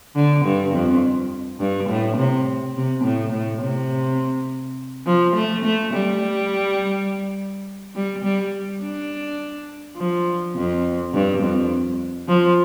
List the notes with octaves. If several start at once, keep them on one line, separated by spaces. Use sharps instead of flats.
D3
G2
F2
G2
A2
C3
C3
A2
A2
C3
F3
A3
A3
G3
G3
G3
D4
F3
F2
G2
F2
F3